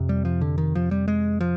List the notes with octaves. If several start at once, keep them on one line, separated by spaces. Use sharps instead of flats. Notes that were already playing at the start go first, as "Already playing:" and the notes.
Already playing: F2 C3
G3
F3
D3
D#3
F3
G3
G#3
F3